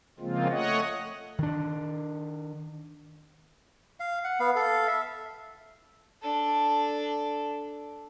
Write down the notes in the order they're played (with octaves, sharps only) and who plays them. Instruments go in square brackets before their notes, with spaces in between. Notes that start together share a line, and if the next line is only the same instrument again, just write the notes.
[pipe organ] C#3 F3 G#3 A#3 C4 F4
A3 C#5 D#5 F#5
[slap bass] D#3 D4
[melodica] F5
F#5
B3 F5
A4 F5
E5
[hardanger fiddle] D4 A4